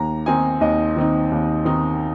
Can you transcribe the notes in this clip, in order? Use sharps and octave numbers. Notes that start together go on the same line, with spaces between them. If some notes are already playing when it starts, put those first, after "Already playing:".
Already playing: D#2 A#5
D#3 C4 D#4 G#5
D#2 D#5
D#3 C4 D#4
D#2
D#3 C4 D#4